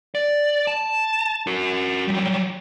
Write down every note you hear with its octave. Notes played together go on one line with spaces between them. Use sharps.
D5
A5
F#4 A#4
F#3 G3